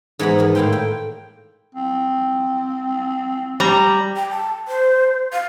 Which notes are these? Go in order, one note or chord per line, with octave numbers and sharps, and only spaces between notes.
G#2 E3 G#3 B3 A#5 B5
E2 D#3
A2 A#3 E4 F5 G5 C6
G5
C4
G3 A#5
G5
A5
C5
F5